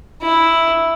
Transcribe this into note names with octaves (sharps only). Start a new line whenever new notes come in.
E4